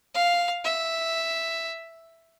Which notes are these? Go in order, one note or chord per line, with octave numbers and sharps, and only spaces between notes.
F5
E5